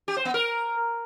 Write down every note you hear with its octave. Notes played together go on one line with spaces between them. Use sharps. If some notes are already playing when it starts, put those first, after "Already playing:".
G4
C5
B3
A#4